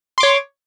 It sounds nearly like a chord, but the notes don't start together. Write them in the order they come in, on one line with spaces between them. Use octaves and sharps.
C6 D6 C#5